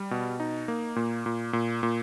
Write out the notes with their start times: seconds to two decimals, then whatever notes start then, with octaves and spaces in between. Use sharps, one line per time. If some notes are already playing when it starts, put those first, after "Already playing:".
Already playing: G3
0.11 B2
0.40 D#4
0.68 A#3
0.96 A#2
1.26 A#2
1.53 A#2
1.83 A#2